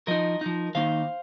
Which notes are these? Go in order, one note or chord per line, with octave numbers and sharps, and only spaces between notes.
F3 D#4 A#4 D#5
F3 D#4
D#3 A#3 D#4 C5 F5